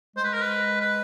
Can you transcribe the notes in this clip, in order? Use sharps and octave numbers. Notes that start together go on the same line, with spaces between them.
G#3 C5
B4
A#4
B4
B4